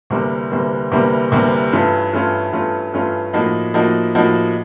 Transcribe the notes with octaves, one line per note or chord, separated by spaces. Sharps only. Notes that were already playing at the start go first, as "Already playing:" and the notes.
D2 C3 E3 G3 A#3
D2 C3 E3 G3 A#3
D2 C3 E3 G3 A#3
D2 C3 E3 G3 A#3
G2 E3 A3 C#4 F4
G2 E3 A3 C#4 F4
G2 E3 A3 C#4 F4
G2 E3 A3 C#4 F4
A2 F3 A#3 D#4 F#4
A2 F3 A#3 D#4 F#4
A2 F3 A#3 D#4 F#4